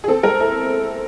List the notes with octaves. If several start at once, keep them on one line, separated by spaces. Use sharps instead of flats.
G#4
C4 A4
G#3 A#4
E4 A4